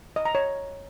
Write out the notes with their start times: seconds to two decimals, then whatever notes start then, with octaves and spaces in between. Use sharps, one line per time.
0.16 D#5
0.25 A#5
0.35 C#5